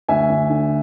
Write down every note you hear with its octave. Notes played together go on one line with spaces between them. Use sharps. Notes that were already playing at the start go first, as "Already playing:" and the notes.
D2 E5 G#5
D2
D3